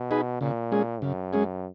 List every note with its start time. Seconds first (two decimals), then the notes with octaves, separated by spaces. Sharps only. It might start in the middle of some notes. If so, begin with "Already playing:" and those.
Already playing: B2
0.11 D#4 G#4 B4
0.41 A#2 C#3
0.72 G#3 C#4 G#4
1.02 F#2 C#3
1.33 G#3 C#4 G#4